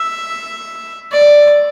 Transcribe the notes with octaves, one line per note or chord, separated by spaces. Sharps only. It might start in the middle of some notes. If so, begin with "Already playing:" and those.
Already playing: E5
D5